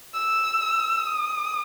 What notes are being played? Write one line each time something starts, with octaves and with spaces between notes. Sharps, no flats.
E6
D#6